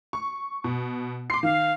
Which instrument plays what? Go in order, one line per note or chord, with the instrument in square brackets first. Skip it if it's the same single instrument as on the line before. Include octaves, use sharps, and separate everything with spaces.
[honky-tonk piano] C#6
B2
[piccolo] C6 [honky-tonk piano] D6 C7
[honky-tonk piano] D#3 [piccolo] F5